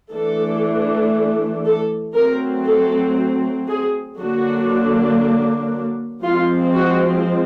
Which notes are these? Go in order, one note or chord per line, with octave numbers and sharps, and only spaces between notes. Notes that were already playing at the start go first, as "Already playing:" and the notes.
E3 A3 D4 A4
A4
F#3 A3 C4 A#4
A4
G#4
D3 F#3 A#3 D4 F#4
F3 G#3 C4 F4
F#4